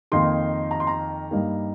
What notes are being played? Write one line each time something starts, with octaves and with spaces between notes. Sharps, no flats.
F2 D#3 A#3 D#4 C6
A#5
C6
A#5
G2 G3 A#3 D#4